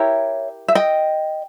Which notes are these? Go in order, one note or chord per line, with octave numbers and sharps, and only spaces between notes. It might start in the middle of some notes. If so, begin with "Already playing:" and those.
Already playing: E4 G4 A#4 C#5 E5
E5
D#5 G5